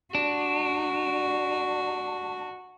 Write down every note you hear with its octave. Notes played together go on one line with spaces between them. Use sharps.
D4 F#4